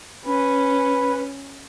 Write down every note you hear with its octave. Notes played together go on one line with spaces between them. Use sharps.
C#4 B4